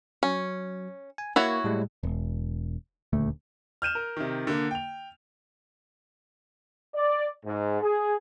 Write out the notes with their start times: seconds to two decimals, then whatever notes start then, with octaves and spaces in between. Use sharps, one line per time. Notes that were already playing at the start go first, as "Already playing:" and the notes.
0.23 F#3 C#4
1.18 G#5
1.36 A#3 E4 F#4 C#5
1.64 A2 G3 G#3
2.03 E1
3.13 D#1 D2 A3
3.82 F6 G6 D#7 E7
3.95 A#4
4.17 C3 D#3
4.47 D3 A#3
4.71 G5 F7
6.94 D5
7.45 G#2
7.82 G#4